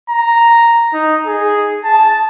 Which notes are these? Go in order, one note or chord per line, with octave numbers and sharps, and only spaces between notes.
A#5
D#4
G#4
A5